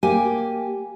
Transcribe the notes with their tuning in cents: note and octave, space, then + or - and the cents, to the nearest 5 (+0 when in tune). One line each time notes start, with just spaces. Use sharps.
A#3 +0 G4 +0 G#5 +0